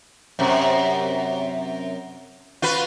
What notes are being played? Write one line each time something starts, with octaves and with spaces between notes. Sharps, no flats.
F#2 C3
F4 F#4 B4